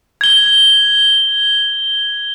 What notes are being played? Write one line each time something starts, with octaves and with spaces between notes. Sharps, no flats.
G#6 G7